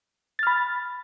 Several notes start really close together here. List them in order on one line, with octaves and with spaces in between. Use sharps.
A6 F6 B5